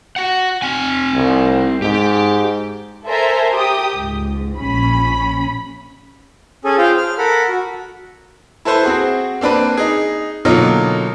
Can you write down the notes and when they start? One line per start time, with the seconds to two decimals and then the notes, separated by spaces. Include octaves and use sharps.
0.16 F#4 F#5
0.62 C4 G#5
1.14 C2
1.82 G#2 G4
3.07 A4 A#4 C5 E5 G#5 A#5
3.53 G4 D#6
3.95 C#2 G#2
4.58 A#1 C#4 B5
6.65 C#4 G#4 A4 G#5
6.78 F4 G#4 C5 F5 G5
6.97 F6
7.18 A4 A#4 F#5 B5
7.48 F#4
8.65 E4 A4 B4 C5
8.83 C4 F#4 G#4
9.41 A#3 C4 D4 B4
9.77 D#4 G#4
10.45 B2 D3 F#3 A#3 D#4 F4